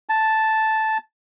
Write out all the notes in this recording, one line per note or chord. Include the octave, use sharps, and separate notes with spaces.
A5